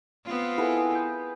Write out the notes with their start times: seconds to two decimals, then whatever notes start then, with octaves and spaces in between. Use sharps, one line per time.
0.25 B3 C4 F4
0.58 E4 G#4 A4 B4 F#5
0.95 G6